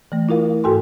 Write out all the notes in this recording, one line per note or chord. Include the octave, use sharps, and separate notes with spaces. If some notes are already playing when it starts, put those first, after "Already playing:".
E3 A3
E4 F4 A#4 F5
G#2 F#4 A4 G5 G#5 C6